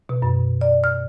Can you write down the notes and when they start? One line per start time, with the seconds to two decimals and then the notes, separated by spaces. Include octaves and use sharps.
0.09 B2
0.22 F#2
0.61 D5
0.84 F6